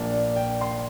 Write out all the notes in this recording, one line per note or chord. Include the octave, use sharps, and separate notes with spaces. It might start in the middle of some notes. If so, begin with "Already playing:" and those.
Already playing: A#1 A#2 A#3 D4 F4
D5
G5
C6